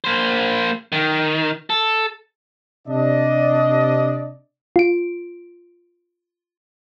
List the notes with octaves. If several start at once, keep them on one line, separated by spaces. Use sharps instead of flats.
A#3 C5
D#3
A4
C3 D4 D5 D#5
F4 D7